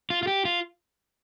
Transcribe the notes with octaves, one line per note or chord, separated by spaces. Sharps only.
F4
F4
G4
F4